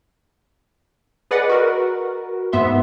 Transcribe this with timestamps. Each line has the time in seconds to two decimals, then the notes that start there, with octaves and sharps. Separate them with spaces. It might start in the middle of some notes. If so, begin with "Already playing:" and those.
1.31 G#4 B4 D5 D#5 F#5
1.49 F#4 A#4 B4
2.52 G#2 B3 E5 C6